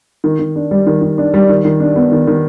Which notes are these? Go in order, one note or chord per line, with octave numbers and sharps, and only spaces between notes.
D#3
D#3
D4
G3
D#3
D#3
D4
G3
D#3
D#3
D4
B3
D#3
D#3